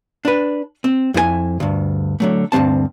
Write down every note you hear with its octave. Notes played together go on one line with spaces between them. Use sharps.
D4 B4
C4
F2 E4 A#4 G#5
D2 G2
D3 F#3 A3
D2 G2 F#3 C4 A5